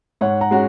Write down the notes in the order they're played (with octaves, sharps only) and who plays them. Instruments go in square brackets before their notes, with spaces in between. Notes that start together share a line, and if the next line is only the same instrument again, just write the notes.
[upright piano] G#2 [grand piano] C#5 F#5
[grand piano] F#5 A#5
[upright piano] G#3 C#4 F#4